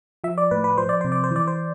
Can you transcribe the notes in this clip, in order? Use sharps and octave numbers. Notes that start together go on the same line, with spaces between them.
F3 E5
D5
A2 B4
B4
F3 C5
D5
C3 C5
D5
C5
E3 D5
C5